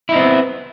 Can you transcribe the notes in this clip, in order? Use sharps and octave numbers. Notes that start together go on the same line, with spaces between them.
B3 C4 D#4 E4